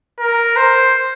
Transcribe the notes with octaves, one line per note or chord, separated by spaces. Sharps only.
A#4
C5